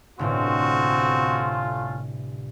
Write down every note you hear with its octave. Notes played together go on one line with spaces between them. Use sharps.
G1 A2 C3 A3 C4 C#4 F4 F#4